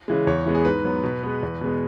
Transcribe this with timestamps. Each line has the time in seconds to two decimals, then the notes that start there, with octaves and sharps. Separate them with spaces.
0.08 C#3 E3 G#3
0.27 E2 C#5
0.46 E3 G#3 B3
0.55 G#4
0.65 G#2 B4
0.85 F#3 B3
1.03 B2
1.23 G#3 B3
1.43 E2
1.61 B2 G#3 B3